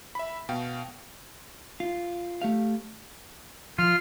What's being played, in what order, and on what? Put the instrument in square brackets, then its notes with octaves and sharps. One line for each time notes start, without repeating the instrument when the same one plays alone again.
[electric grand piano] E5 B5
B2 F5 G5
[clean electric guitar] F4
A3 G4 F5
[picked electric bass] F3 [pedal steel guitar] F4 [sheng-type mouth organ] F6